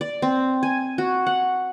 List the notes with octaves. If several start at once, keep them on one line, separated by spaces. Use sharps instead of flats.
D5
C4
G#5
F#4
F#5